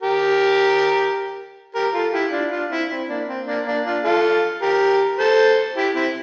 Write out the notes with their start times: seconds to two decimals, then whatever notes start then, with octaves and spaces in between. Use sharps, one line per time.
0.02 G4 A#4
1.75 G4 A#4
1.94 F4 A4
2.13 E4 G4
2.32 D4 F4
2.51 D4 F4
2.70 C4 E4
2.89 C4 E4
3.09 A#3 D4
3.28 C4
3.46 A#3 D4
3.65 A#3 D4
3.85 D4 F4
4.04 F4 A4
4.62 G4 A#4
5.19 A4 C5
5.76 E4 G4
5.95 C4 E4